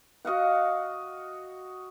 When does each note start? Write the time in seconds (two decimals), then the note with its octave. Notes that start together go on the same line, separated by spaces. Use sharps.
0.25 F#4 D#5 F5 F#5